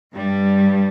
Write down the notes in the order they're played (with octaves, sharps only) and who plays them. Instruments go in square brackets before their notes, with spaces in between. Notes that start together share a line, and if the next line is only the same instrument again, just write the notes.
[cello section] G2 G3